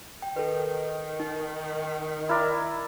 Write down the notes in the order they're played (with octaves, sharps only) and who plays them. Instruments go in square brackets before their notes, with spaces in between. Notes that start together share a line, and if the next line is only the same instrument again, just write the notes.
[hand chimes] G5
[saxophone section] D#3 [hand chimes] A4 B4
[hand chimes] D#4
[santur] E4 A#4 D5